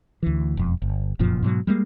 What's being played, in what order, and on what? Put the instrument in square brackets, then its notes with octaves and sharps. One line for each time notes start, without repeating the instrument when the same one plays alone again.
[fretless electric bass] D2 E3
E1 F2
G1
F1 F#2 A#2 F3
G#2 B2 F#3
G3 G#3 A#3